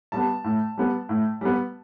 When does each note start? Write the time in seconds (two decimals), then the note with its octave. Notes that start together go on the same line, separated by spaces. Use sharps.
0.12 G3 B3 A5
0.44 A2
0.78 G3 B3
1.09 A2
1.41 G3 B3